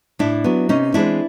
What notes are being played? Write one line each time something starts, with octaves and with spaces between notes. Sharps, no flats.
A2 D4 E4
F#3 B3
C3 C#4 D#4
E3 G#3 C4 D4 E4